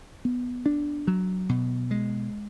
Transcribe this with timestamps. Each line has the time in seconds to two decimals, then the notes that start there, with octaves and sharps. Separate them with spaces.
0.25 B3
0.66 D4
1.07 F#3
1.49 B2
1.91 G#3